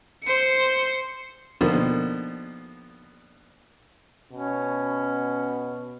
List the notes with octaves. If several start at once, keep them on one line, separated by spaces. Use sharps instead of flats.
C5 C#7
B2 D3 D#3 F3 A#3
B2 C#4